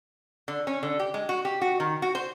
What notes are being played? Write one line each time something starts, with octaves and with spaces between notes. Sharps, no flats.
D3
C#4
D3
G4
G#3
F#4
G4
F#4
D#3
F#4
C5